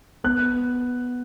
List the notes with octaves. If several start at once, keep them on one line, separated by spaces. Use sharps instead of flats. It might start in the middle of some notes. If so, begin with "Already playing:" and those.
B3 F#6